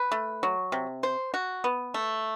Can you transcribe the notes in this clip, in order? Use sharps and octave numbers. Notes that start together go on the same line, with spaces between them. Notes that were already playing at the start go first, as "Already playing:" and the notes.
Already playing: B4
A3
F#3
C3
C5
F#4
B3
A3